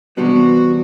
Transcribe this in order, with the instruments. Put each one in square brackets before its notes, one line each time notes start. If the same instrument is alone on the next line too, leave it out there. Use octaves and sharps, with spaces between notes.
[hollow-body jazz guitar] E2 C3 G3 B3 D4 [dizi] F#4